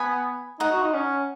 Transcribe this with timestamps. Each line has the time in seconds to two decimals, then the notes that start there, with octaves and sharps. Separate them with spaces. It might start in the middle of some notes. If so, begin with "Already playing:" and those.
Already playing: B3 G#5 B5
0.59 D#4 F#5 A#5
0.72 F#4
0.83 D#4
0.94 C#4